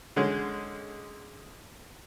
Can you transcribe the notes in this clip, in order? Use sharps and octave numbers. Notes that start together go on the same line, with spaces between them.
D3 G#3 C#4